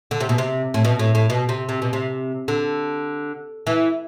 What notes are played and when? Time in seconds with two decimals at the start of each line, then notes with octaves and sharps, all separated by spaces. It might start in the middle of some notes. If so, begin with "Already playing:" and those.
0.11 D3
0.20 C3
0.29 B2
0.38 C3
0.74 A2
0.85 B2
0.99 A2
1.15 A2
1.30 B2
1.49 C3
1.69 C3
1.82 B2
1.93 C3
2.48 D3
3.67 E3